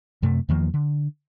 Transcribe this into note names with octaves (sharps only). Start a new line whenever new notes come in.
F#2 C3 A3
E2 D#3 F3 A#3
D3